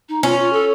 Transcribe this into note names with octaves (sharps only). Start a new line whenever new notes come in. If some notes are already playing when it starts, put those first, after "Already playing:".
D#4
C#4 F4
F4
A4